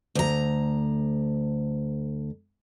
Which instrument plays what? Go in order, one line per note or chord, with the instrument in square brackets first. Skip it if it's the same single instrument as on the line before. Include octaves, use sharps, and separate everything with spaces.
[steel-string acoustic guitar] D2 A#5